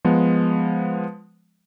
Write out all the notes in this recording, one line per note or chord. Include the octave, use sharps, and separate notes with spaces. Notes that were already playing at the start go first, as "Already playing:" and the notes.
F3 G#3 B3